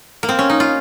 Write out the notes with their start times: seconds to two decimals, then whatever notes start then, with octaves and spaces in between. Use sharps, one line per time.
0.23 A#3
0.29 C4
0.39 C#4
0.50 D#4
0.60 F4